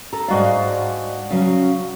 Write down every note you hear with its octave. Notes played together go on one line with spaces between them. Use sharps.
A4 A#5
G#2 G#3 D4 F#4 D5 F5
C#3 F#3 C#4